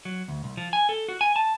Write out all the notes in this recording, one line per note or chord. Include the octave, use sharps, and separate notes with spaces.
F#3
D2
C2
F3
G#5
A4
F#4
G#5
A5